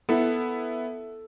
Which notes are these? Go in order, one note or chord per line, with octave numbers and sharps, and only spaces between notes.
B3 E4 A4